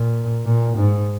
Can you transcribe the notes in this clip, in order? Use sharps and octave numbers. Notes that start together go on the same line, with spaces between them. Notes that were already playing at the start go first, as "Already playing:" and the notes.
Already playing: A#2
A#2
G#2